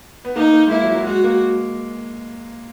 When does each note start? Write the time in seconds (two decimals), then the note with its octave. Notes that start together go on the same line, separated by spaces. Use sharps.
0.25 B3
0.36 A#3 D#4
0.54 A#3
0.67 G#3
0.71 A#3 E4
0.83 F#3
0.95 F#3
1.06 G#3 F#4
1.24 A#3